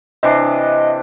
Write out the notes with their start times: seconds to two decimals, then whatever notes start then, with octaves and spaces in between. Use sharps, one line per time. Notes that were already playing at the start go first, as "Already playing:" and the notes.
0.23 C3 E3 D4 D#5